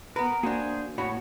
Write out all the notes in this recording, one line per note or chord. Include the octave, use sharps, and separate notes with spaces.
B3 A#4 B4
A#3 D4 F#4 G#4 C5 G#5
A2 F#4 C#5 B5